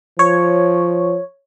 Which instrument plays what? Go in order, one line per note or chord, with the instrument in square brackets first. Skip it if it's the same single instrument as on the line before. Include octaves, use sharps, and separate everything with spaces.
[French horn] F3 [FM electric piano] C#5